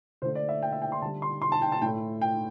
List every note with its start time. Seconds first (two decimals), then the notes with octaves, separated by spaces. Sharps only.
0.22 D3 A3 C5
0.35 D5
0.49 E5
0.62 G5
0.72 E5
0.82 G5
0.92 C6
1.02 D3 A5
1.05 G3
1.22 C6
1.42 C6
1.52 A5
1.62 G5
1.72 A5
1.82 A2 G5
1.86 A3
2.21 G5